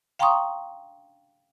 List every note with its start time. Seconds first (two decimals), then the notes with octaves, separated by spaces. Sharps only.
0.19 F5 G5 A#5 C6 C#6 D#6